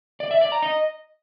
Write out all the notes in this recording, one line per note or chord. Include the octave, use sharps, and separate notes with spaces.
D5
E5
D5
A#5
D#5